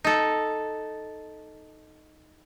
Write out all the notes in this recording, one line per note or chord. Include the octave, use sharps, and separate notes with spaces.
D#4 A4